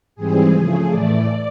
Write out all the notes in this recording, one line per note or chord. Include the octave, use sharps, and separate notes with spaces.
G#2 E3 G3 C4 G#4
C#3 F3 A3
A2 E3 A3 D5